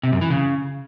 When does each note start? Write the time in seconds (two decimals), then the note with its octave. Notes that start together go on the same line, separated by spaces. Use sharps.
0.03 C3
0.12 F#2
0.21 E3
0.30 C#3